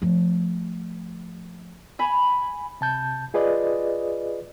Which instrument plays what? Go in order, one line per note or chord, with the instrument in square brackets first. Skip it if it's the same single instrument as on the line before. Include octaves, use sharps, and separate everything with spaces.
[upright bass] F3 A3
[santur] G#5 B5
[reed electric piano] C3 A5 G6
F4 G#4 B4 D5 D#5